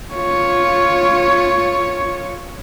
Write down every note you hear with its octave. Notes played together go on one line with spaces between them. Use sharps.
F4 C#5